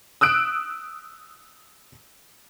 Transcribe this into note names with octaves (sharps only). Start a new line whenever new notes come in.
D#6 E6 F#6 D7